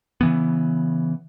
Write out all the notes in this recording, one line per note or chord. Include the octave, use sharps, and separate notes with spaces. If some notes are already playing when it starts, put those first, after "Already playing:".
C#3 E3 B3